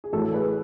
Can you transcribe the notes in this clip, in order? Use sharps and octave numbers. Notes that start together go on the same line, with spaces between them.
G#4
A1 A2 E3 F#4 A4
G#4 B4